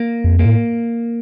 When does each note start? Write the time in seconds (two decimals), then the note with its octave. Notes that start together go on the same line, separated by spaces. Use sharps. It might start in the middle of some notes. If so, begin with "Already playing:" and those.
Already playing: A#3
0.24 F2
0.39 A#3
0.45 A2